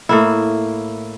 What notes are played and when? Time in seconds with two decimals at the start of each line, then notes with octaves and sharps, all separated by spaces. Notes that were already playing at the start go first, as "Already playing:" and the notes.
0.09 A2 A#3 E4